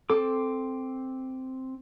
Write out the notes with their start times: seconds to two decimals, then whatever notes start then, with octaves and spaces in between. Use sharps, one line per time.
0.10 C4 A4 D6